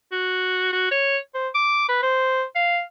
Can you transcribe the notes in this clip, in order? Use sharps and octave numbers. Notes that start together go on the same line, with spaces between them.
F#4
F#4
C#5
C5
D6
B4
C5
F5